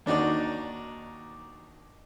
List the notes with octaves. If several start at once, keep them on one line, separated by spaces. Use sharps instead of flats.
D#2 D4 D#4 F#4 D5